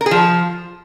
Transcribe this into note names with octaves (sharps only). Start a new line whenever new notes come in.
A#4
G#4
F3